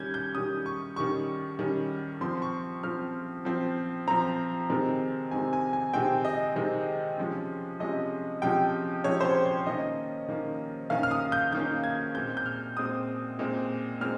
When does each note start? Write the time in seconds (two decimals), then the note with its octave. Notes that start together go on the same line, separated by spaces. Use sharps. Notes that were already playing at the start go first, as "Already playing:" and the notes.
Already playing: D#3 G3 C#4 G6 G#6
0.14 G6
0.35 D#3 G3 C#4 D#6
0.66 C#6
0.96 D#3 G3 C#4 C#6
1.59 D#3 G3 C#4
2.21 F3 C4 C6
2.42 C#6
2.83 F3 C4 F6
3.45 F3 C4
4.08 F3 C4 A#5
4.70 C3 D#3 G#3 C4
5.31 C3 D#3 G#3 C4 G#5
5.53 G#5
5.73 G#5
5.94 C3 D#3 G#3 C4 G5
6.25 D#5
6.56 C3 D#3 G#3 C4
7.18 C3 F3 G#3 C#4
7.80 C3 F3 G#3 C#4 D#5
8.42 C3 F3 G#3 C#4 G5
9.04 C3 F3 G#3 C#4 C#5
9.21 C5
9.25 C#5
9.46 C#5
9.66 D#3 A#3 C#4 D#5
10.28 D#3 A#3 C#4
10.90 D#3 A#3 C#4 F5
11.03 F6
11.11 D#6
11.32 G6
11.53 D#3 A#3 C#4 G6
11.84 G#6
12.15 A#2 G#3 C4 G6
12.37 G6
12.46 F6
12.76 A#2 G#3 C4 D#6
13.39 A#2 G#3 C4
14.01 A#2 G#3 C4 F6